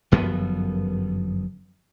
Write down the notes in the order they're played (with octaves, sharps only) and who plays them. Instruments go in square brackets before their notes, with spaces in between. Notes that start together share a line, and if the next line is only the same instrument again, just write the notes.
[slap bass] G1 F#2 F3 B3